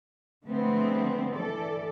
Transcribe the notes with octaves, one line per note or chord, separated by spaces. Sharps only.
D3 F3 G#3 A3 B3 C4
E3 A4 D5